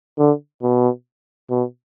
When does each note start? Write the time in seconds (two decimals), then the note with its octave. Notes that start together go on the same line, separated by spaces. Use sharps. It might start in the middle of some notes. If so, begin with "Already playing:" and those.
0.18 D3
0.62 B2
1.50 B2